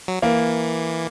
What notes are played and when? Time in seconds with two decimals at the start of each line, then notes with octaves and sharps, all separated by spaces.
0.08 F#3
0.22 E3 A#3